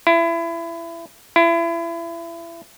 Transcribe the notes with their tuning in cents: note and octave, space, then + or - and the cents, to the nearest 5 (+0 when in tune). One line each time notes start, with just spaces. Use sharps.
E4 +25
E4 +30